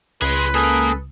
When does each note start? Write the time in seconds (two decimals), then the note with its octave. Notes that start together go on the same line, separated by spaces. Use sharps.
0.22 C#2 G#4 B4 C6
0.55 A#3 G#4 A4